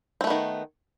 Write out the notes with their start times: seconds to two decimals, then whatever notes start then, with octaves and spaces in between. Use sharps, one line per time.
0.21 C4
0.24 A3
0.27 B3
0.30 D#3